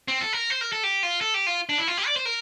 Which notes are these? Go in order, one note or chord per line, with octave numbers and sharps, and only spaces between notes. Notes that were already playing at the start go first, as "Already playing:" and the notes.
C4
A4
A#4
C5
A#4
A4
G4
F4
A4
G4
F4
D4
E4
F4
G4
D5
C5
A#4